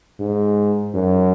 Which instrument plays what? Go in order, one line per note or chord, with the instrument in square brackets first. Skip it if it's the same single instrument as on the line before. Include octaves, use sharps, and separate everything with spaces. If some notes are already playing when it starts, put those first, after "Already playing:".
[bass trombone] G#2
F#2